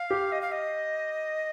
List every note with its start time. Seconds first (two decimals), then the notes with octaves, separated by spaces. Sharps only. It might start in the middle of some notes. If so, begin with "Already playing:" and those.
Already playing: F5
0.11 G4
0.32 D#5
0.41 F5
0.52 D#5